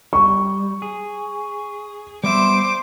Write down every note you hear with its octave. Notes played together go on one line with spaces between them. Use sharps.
G3 C#6
G#4
G3 B3 C5 E5 D6